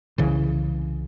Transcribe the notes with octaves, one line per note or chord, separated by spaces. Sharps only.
C2 C#3 E3